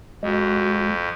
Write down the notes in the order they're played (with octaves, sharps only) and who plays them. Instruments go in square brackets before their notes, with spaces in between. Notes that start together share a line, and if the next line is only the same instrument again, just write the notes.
[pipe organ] F2 [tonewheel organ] G#3 [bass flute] F#4